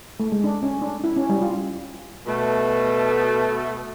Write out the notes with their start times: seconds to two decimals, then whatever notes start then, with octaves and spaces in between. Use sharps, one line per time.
0.20 A3
0.32 G#3
0.44 D4
0.63 C#4
0.82 D4
1.04 E4
1.16 C#4
1.30 G3
1.42 F4
2.27 B2 A3